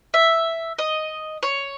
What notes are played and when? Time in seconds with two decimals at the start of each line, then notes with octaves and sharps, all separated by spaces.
0.14 E5
0.78 D#5
1.43 C#5